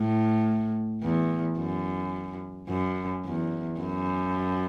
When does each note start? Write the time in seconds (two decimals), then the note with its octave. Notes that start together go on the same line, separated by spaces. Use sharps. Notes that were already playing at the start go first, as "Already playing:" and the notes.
Already playing: A2
1.03 E2
1.58 F#2
2.69 F#2
3.25 E2
3.80 F#2